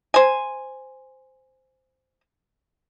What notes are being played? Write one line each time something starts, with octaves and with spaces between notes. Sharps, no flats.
C5 G#5